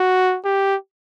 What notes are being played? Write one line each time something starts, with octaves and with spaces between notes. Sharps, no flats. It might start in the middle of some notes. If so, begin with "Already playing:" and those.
Already playing: F#4
G4